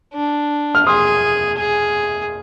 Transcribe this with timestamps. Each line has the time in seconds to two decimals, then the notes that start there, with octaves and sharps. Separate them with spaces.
0.14 D4
0.75 F6
0.86 G#4 C6 D#6
1.58 G#4